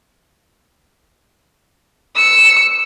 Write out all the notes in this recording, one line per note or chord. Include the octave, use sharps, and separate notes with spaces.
E6 C#7